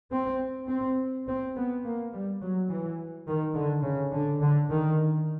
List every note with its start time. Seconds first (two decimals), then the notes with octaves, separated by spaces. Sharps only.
0.12 C4
0.69 C4
1.28 C4
1.56 B3
1.84 A#3
2.13 G3
2.42 F#3
2.70 E3
3.27 D#3
3.55 D3
3.84 C#3
4.14 D3
4.42 D3
4.70 D#3